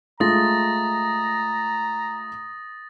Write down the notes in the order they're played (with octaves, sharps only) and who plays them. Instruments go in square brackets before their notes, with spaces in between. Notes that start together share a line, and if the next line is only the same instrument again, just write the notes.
[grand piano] G#3 A3 F4 [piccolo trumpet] A#5 [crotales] D#6 A6 A#6